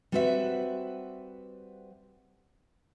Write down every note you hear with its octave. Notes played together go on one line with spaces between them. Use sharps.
G3 C4 F#4 B4 E5